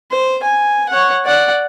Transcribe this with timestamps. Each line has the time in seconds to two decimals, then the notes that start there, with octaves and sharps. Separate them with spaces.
0.11 C5
0.43 G#5
0.89 C#5 F#5
1.26 D5 F#5